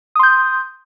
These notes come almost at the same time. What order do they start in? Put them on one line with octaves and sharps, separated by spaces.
D#6 C6 G6